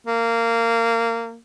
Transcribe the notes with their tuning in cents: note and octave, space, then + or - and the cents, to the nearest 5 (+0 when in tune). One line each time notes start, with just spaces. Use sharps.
A#3 -20